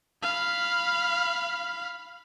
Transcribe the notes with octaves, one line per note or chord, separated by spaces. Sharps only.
F5 B5